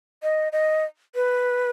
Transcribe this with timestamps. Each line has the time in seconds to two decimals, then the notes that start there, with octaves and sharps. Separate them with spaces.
0.23 D#5
0.53 D#5
1.15 B4